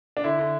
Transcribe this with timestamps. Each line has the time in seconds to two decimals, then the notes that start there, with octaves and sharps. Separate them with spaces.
0.17 D4
0.24 D3 E4
0.39 D3